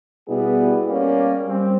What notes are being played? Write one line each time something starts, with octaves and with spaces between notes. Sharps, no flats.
B2 G3 B3 E4 G#4
G3 A#3 C#4
G3 C4